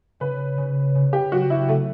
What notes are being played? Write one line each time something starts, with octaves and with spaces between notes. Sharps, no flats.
C#3 B4
C#3
C#3
G4
F#3 F#4
E4
C#3 A3